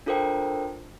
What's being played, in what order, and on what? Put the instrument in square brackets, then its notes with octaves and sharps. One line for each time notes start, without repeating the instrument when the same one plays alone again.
[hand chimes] D4 F4 A4 A#4 C5 G5